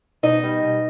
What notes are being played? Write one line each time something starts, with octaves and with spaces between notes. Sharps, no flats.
B2 D#4 D#5
G3
B2